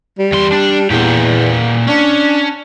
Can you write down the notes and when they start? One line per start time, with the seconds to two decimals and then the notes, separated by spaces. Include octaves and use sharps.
0.19 G3
0.32 E2 C6
0.52 D4
0.90 E2 A#2 G4
1.88 C#4 D4